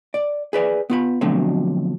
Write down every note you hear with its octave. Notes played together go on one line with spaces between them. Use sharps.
D5
G#4 B4 D5 G#5
B3 F4 B5
B2 D3 F3 F#3 A3 C4